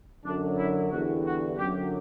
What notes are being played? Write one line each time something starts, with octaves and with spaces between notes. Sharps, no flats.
F#2 D3 F#3 D4
E4
E2 D3 G3 F#4
F#4
F#2 D3 F#3 G4